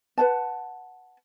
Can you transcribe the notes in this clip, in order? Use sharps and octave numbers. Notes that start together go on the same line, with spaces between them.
B4 F#5 A5